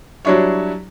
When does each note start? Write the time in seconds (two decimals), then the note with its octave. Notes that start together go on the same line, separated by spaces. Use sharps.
0.25 F#3 G3 D4 E4 C#5